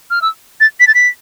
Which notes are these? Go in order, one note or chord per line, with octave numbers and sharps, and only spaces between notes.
F6
E6
A6
B6
A6
B6